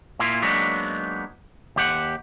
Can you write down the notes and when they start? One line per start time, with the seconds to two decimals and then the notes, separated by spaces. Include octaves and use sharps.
0.19 A#2 A#3 E4 F4
0.42 F#3 G#3 A#3 B3 D4 D#4
1.76 D#2 G4 F#5